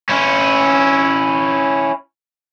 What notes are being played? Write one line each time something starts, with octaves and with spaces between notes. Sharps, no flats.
C#4 E4